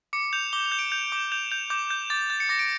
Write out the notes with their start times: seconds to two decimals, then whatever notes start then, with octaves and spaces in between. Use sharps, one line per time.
0.13 D6 C#7
0.33 G6 F7
0.53 D6 G7
0.66 F7
0.72 G6
0.79 D7
0.92 G6 F7
1.12 D6
1.32 G6 F7
1.51 G6 F7
1.70 D6 G6
1.90 G6
2.10 D6 A6
2.30 G6 A6
2.40 C#7
2.49 D6 A#6
2.59 D7